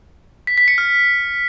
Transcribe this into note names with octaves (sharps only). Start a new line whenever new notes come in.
B6
B6
C#7
F6